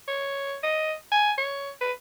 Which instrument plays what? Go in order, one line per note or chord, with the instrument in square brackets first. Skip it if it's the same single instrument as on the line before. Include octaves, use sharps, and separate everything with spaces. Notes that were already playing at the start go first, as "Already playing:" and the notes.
[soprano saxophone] C#5
D#5
G#5
C#5
B4